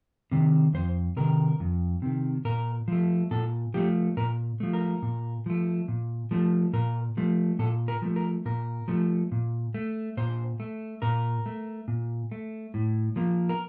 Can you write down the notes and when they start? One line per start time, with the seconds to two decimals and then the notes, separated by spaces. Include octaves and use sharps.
0.31 C3 D#3
0.74 F2 C5
1.16 C3 D#3 A#4
1.60 F2
2.02 C3 D#3
2.45 A#2 A#4
2.88 F3 A3
3.31 A#2 A4
3.74 F3 A3 G4
4.17 A#2 A#4
4.60 F3 A3
4.73 A#4
5.02 A#2
5.46 F3 A3
5.88 A#2
6.31 F3 A3
6.73 A#2 A#4
7.17 F3 A3
7.59 A#2 A4
7.88 A#4
8.02 F3 A3
8.16 A#4
8.45 A#2 A#4
8.88 F3 A3
9.32 A#2
9.74 A3
10.17 A#2 C5
10.60 A3
11.02 A#2 A#4
11.46 A3
11.88 A#2
12.32 A3
12.74 A2
13.16 F3 A#3
13.49 A#4